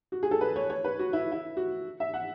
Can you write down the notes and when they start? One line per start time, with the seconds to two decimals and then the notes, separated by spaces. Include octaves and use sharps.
0.12 F#4
0.23 G#4
0.31 A4
0.41 B4
0.56 C#5
0.70 C#5
0.84 B4
0.99 F#4
1.13 E4
1.32 E4
1.57 F#4
2.00 E5
2.14 F#5